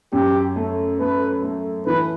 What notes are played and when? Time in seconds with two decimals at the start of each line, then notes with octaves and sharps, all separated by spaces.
0.13 F#2 G4
0.56 A3
1.00 A3 B4
1.43 A3
1.86 E3 B4